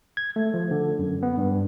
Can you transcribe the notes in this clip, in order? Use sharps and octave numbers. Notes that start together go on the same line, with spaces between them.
G#6
A3
F3
D3
F#2
B3
G2